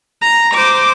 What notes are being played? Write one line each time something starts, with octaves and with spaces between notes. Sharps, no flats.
A#5
C5 D6